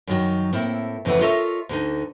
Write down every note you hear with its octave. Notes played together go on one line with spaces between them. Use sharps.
F#2 D#3 F#3
A2 A#3 C4 E4
F2 C#3 E3 A3 E4 F#5
F4 A4 A#4 C#5 D#5 E5
D2 D3 D#4